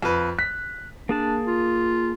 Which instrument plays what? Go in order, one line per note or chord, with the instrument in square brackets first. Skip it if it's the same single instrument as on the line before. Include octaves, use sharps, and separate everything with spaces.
[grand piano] F2 B4
[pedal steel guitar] F#6 [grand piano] B6
[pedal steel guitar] A#3 G#4 A5 [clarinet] D4
[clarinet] F4